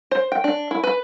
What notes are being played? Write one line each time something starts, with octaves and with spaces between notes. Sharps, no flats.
C5
G5
D4
E4
B4